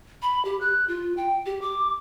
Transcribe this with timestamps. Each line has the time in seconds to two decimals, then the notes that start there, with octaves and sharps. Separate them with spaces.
0.22 B5
0.45 G4
0.61 F#6
0.88 F4
1.17 G5
1.46 G4
1.62 D6